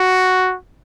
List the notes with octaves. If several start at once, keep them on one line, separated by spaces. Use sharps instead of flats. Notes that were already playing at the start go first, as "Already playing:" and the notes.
Already playing: F#4